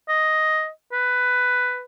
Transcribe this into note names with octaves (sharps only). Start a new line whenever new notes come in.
D#5
B4